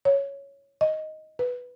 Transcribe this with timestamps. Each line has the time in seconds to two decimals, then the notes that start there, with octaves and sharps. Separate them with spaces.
0.05 C#5
0.81 D#5
1.39 B4